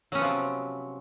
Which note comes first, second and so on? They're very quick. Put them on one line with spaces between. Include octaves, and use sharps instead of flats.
F#3 C#4 B3 F3 C3